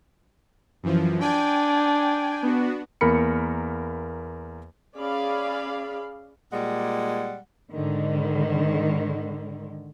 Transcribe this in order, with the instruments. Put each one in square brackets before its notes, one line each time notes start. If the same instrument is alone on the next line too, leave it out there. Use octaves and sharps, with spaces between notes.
[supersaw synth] F#2 E3 F3
[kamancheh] D4 [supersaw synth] G5 G#5
[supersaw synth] B3 D4 F#4
[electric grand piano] E2 A#3 A#4 B5 C#7
[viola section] C#4 G#4 D5 F5 B5
[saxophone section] A#2 G3 G#3 F#5
[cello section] G#2 D3 D#3